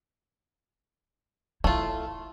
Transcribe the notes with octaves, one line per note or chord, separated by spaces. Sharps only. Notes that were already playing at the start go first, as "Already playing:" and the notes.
A3 E4 F4